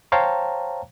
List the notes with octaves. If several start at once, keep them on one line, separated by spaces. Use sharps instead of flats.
C5 C#5 F5 G5 A5 A#5